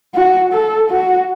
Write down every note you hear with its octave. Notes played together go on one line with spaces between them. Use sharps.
F#4
A4
F#4